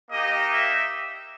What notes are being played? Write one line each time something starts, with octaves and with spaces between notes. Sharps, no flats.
A#3 D#4 G4 D#5
E5